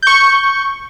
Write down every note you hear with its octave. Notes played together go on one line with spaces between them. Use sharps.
C#6 G6